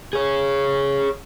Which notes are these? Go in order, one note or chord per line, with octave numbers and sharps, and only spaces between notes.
G#4 C#5